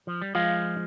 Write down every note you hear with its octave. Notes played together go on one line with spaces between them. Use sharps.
F3
G3
F3 G#3 F4